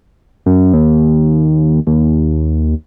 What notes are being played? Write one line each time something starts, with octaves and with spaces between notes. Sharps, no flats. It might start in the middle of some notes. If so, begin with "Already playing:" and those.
F#2
D#2
D#2